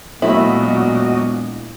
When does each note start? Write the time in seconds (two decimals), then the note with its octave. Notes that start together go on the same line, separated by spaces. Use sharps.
0.22 E1 A#2 F#3 A3 E4 F#4 D#5